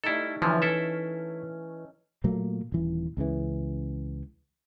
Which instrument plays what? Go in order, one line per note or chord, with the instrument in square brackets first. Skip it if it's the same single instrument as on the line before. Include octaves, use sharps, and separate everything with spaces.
[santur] G3 A3 D#4 [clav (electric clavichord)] E4 A4
[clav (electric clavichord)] D3 F3 [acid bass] E3 [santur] C#4
[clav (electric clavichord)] E4 A4 E5
[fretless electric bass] A#2 F#3 A3 A#3
D#1 E3
C#2 C#3 E3